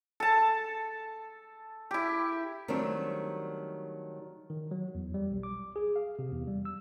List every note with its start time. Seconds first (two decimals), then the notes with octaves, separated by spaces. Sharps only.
0.20 A4 A5
1.91 E4 G4
2.68 D#3 F#3 G3 A3 C4 D4
4.50 D#3
4.71 F#3
4.95 E2
5.14 G3
5.31 B1
5.43 D6
5.76 G#4
5.96 F5
6.19 C3
6.32 E2
6.47 G3
6.65 E6